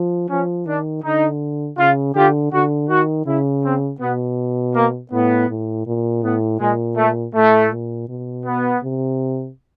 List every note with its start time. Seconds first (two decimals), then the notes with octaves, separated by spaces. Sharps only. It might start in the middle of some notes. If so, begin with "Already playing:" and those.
Already playing: F3
0.29 F3 C#4
0.66 D#3 D4
1.03 D3 D#4
1.78 C#3 F4
2.15 D3 F4 G4
2.52 D3 F#4
2.89 D#3 F#4
3.26 C#3 E4
3.64 C4
4.00 B2 B3
4.75 A#3
5.12 A2 B3
5.49 A2
5.87 A#2
6.23 A2 B3
6.60 A#2 G#3
6.97 A3
7.35 A2 A3
7.71 A#2
8.09 B2
8.45 B3
8.83 C3